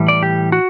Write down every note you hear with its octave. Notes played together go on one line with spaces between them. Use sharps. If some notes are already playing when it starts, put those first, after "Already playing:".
Already playing: A2 E3 G3
D5
G4
F#4